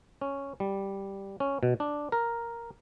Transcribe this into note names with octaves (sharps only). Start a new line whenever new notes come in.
C#4
G3
C#4
B2
D4
A#4